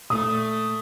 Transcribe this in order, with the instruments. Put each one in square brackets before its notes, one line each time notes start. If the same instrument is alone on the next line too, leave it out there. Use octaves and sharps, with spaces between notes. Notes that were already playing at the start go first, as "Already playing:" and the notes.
[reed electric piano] A#2 [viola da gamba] A3 [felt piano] D#6